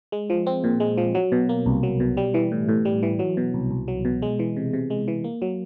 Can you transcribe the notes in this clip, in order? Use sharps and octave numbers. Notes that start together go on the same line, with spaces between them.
G#3
F3
C4
A#2
G#3
F3
F#3
B2
A#3
C2
F#3
B2
G3
E3
A2
A2
G3
E3
F#3
B2
C2
C2
F#3
B2
G#3
E3
C3
C3
G#3
E3
A#3
F#3